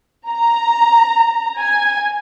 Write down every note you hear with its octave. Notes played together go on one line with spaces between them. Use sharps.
A#5
G#5